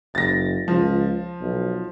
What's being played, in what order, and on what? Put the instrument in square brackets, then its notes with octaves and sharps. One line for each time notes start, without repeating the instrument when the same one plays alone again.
[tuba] F#1 [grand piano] A6 A#6
[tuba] C#2 [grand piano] F3
[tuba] B1